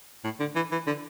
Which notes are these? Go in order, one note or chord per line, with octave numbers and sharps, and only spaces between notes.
A2
D3
E3
E3
D3